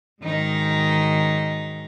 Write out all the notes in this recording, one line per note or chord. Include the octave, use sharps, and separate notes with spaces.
G#2 D#3 F#3 D#4